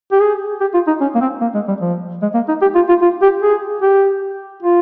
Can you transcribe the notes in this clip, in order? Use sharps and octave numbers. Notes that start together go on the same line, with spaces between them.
G4
G#4
G4
F4
D#4
C#4
A#3
C4
A#3
G#3
G3
F3
G#3
A#3
D#4
G4
F4
F4
F4
G4
G#4
G4
F4